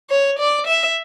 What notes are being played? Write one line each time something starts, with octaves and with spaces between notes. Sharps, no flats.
C#5
D5
E5